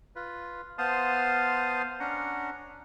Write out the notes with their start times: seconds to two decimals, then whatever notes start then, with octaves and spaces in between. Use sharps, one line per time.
0.16 F4 B4
0.78 B3 C5 F5 A5 C6 D#6
2.00 C#4 D4 F#5 A#5